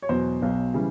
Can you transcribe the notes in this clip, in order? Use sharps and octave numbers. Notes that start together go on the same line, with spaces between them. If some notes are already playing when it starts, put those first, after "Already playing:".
C#5
E2 B2 F#3 C5
B1 B2 F#3
C#3 E3 G3